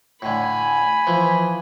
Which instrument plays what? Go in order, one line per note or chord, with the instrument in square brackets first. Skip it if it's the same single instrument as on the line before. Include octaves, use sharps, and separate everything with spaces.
[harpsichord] A2 D3 [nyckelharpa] G#5 B5
[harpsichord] E3 F3